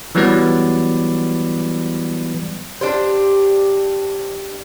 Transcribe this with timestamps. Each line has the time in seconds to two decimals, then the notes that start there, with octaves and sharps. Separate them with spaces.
0.15 E3 F#3 G3 B3 B4 D5
2.81 D4 G4 C5